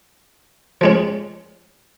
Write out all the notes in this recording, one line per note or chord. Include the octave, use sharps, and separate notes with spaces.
F3 G#3 C#4